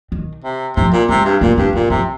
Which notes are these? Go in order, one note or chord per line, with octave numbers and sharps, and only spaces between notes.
D#3
C3
C3 F3
A#2
C3 G3
G2
A#2 A#3
G2 C4
A#2 A#3
C3 F3